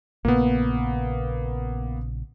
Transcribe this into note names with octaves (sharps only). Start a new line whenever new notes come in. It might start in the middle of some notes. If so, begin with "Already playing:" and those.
A#1 A#2 C#3 A#3 B3